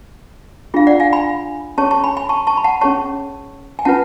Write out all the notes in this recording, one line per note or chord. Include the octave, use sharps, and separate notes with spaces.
D4 F4 G#4 F5
D5 F#5
F5 G#5
G#5 B5
C#4 G#4 C#5 A5 C#6
A5 C#6
G#5 B5
G#5 B5
A5 C#6
A5 C#6
B5
F#5 A5
C#4 G#4 C#5 A5 C#6
G#5
C#4 F4 B4 F#5 A5